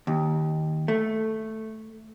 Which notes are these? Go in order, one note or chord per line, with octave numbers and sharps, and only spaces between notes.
D#2
A3